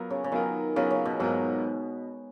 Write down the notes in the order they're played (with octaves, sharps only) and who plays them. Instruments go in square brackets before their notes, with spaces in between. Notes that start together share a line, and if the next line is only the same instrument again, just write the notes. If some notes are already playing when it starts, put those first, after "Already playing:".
Already playing: [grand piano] F#3 B3 F4 A#4
[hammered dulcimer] C#3
C#3
[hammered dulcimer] D#3 [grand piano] F#3 B3 F4 A#4
[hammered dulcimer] C#3 [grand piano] F#3 B3 F4 A#4
[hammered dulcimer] C#3
B2
[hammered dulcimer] G#2 [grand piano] F#3 B3 F4 A#4